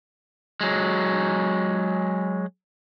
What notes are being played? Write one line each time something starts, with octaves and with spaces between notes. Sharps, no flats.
F#3 G#3